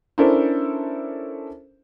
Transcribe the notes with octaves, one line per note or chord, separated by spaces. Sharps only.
C#4 D4 E4 A4 A#4 C5